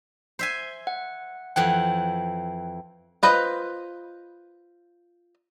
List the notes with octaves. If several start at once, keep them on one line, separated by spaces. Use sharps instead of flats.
C5 E5 G#5
F#5
F2 E3 F#5 G5
F4 B4 C5 D#5